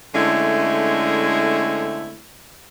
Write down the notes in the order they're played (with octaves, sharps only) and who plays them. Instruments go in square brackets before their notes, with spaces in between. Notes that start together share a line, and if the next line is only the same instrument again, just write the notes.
[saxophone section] D3 G#3 A3 C4 C#4 E4